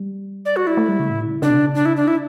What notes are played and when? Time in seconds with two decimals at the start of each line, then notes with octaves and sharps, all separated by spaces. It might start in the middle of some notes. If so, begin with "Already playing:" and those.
Already playing: G3
0.45 D5
0.56 F#4
0.67 E4
0.77 A3
0.89 G3
1.00 C#3
1.10 A2
1.26 C#3
1.42 C#3 D4
1.50 B2
1.57 C#3
1.75 D4
1.86 E4
1.97 D4
2.08 E4